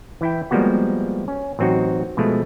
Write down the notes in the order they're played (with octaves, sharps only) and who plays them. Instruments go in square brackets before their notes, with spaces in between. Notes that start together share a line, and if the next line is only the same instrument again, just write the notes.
[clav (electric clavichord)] E3 E4 G5
F3 G3 G#3 A#3 B3 F#4
C#4
A1 F#3 C4 D#4 F#4
B2 F3 G#3 A3